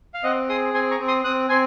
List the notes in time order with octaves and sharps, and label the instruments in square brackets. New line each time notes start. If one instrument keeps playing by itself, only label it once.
[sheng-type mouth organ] F5
C4 D#5 F#5
G#4 C6 D#6
C4 G#5 C6
A#5 C#6
C4
C6 D#6
C4 D#6 F#6
C4 G#5 C6